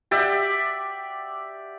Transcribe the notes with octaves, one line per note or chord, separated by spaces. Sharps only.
G4 D5 E5 F#5